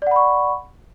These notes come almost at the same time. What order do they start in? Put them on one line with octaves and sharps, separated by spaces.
D5 F#5 B5 C#6